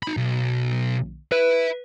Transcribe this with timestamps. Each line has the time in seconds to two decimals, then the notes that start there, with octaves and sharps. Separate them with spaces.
0.03 D#4 B5
0.17 B1
1.32 B4 E5 B5